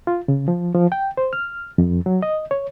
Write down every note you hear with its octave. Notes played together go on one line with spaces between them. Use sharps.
F4
C#3
F3
F3
G5
C5
F6
F2
F#3
D#5
C#5